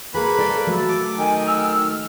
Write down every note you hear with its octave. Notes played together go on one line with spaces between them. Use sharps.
A#3 G#4 A4 B4 B5
A4 D5
F#3 A3 A4
D6
D#3 G#5
E6 F6